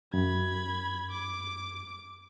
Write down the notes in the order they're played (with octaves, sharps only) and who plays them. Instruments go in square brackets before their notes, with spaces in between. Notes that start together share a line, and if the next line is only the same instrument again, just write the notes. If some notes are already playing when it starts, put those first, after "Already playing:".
[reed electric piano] F#2 [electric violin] B5 G#6
[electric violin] D6